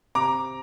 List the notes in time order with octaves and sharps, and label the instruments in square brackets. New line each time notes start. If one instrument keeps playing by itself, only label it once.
[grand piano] C3 A#5 D6